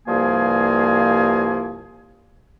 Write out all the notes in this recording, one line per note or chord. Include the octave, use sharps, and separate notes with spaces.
C2 G2 F3 A#3 G#4 G#5